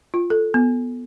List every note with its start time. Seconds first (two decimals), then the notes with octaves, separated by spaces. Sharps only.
0.14 F4
0.30 A4
0.54 B3